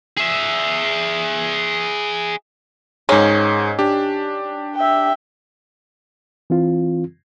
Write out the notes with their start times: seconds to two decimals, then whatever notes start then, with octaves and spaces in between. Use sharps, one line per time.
0.17 G#4 E5
3.09 G#2 D#3 C#4 G#4
3.79 D4 G4
4.75 E5 G5
6.50 E3 C4 F4